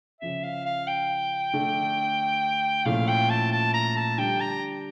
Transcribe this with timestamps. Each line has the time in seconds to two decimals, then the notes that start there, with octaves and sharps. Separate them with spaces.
0.21 C#3 F3 C#4 E5
0.44 F5
0.65 F5
0.87 G5
1.53 D3 A3 D4
2.85 A#2 F3 A3 C#4 E4 F5
3.08 G5
3.30 A5
3.52 A5
3.74 A#5
3.96 A5
4.18 D3 G3 D4 G5
4.40 A#5